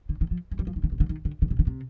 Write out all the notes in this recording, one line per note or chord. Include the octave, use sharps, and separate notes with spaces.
D3
D#3
F3
G#3
G3
F3
D#3
D3
C3
D3
D#3
D3
D3
C3
D3
C3